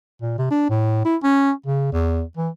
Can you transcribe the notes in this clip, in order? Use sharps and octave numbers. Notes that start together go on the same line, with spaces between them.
A#2
C3
D4
A2
E4
C#4
C#3
E2
E3